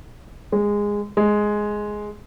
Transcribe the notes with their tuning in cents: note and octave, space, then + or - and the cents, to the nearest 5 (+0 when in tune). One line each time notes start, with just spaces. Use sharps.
G#3 -15
G#3 +5